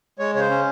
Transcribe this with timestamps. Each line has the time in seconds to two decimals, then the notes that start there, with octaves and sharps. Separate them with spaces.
0.19 G#3 C#5
0.35 C#3 C#5
0.39 C5
0.50 C#4